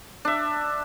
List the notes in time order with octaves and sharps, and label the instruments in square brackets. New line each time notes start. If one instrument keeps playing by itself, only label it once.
[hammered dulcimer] D4 E5